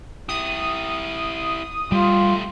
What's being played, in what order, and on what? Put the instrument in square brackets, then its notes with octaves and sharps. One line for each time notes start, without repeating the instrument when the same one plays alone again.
[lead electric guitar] E4 G4 [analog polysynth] D#6
[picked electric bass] G3 [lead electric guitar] A3 G4 [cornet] F4